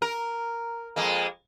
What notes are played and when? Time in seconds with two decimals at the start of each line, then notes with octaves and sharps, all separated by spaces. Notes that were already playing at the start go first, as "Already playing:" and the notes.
0.02 A#4
0.96 F2 G#3 A#3